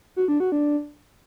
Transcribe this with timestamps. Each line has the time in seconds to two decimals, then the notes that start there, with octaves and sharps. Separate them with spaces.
0.16 F#4
0.28 D4
0.40 F#4
0.52 D4